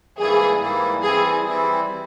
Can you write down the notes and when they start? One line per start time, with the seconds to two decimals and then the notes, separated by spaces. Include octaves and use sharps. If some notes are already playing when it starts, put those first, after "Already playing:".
0.19 G#2 E3 G3 A#3 E4 G#4
0.60 G#2 E3 G3 A#3 E4
1.03 E3 G3 C4 E4 G#4
1.47 E3 G3 C4 E4